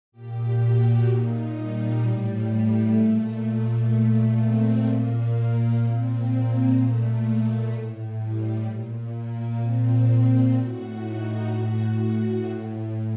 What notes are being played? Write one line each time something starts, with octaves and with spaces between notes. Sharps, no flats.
A#2 G4
F#4
A#2 D#4
G3
A2 G3
A3
A#2 A3
A3
A#2 A3
C4
A#2 A#3
A#2 C4
A#3
A#2 A3
A2
G3
A#2
A#3
A#2 C4
A2 F#4
D#4
A2 F#4
A2